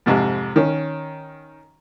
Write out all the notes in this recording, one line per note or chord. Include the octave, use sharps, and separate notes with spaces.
F2 G#2 C3
D#3 C#4